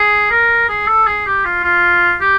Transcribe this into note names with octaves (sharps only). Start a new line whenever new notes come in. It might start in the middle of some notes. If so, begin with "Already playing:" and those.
Already playing: G#4
A#4
G#4
A4
G#4
G4
F4
F4
G4